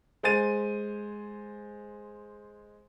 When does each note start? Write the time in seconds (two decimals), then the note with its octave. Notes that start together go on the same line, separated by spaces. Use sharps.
0.23 G#3 C5 G#5 A6 D#7